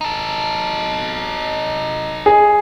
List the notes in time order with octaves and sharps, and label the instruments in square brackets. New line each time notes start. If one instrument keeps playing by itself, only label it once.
[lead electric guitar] D#4 A4
[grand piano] G#4